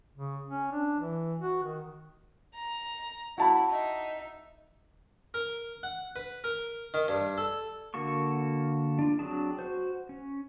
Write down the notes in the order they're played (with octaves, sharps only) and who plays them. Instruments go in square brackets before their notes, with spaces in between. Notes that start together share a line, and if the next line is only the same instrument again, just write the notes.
[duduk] C#3
C#4
D4
E3
F#4
D#3
[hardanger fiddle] A#5
[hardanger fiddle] E4 [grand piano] F#4 A5 B5
[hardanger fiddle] D#4 E5
[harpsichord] A#4
F#5
B4
A#4
D#3
G2
A4
[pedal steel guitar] D3 A#3 F#4 A4 C#6
D4 F4
F#3 C4 D4 G#4 A5
F#4 C5
C#4